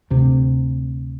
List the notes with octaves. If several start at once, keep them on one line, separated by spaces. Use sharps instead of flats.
D2 C3